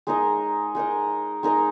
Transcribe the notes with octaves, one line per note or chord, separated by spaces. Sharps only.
G#3 D#4 A#4 D#5
G#3 D#4 A#4 D#5
G#3 D#4 A#4 D#5